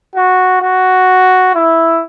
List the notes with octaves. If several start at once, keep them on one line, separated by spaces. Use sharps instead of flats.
F#4
F#4
E4